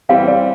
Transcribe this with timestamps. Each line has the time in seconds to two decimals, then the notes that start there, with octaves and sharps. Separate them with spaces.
0.09 E3 G3 C4 F5
0.28 D5